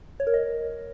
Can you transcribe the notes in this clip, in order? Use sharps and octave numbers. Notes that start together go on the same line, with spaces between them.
C#5
A#4
D#5